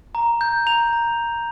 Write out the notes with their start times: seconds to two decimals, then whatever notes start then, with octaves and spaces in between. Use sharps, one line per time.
0.15 A#5
0.41 G6
0.66 A#5 F7
0.93 A#5